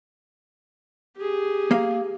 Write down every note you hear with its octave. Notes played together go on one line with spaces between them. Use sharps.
G4 G#4
A#3 F5